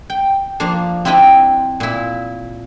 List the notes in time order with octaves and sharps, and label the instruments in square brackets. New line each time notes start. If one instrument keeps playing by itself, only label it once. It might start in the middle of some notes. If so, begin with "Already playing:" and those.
[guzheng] G5
F3 A#3 D4
C4 D4 E4 D#5 G5
A#2 E4